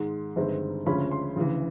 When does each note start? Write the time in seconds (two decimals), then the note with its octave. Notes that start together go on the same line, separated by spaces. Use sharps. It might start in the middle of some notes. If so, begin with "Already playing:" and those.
Already playing: G#2 D#3 G#3 C6
0.36 G1 G2 D#3 G#3 C4
0.86 D2 C#3 F3 G#3 C#4 B5
1.11 C6
1.36 D2 C#3 E3